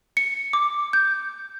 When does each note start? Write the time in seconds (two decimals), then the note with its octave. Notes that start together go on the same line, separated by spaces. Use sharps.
0.17 C#7
0.53 D6
0.93 G6